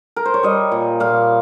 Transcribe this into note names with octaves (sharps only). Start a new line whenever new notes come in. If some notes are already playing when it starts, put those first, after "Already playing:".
A#4
C5
C#5
G3 D#5
A#2
A#2 F5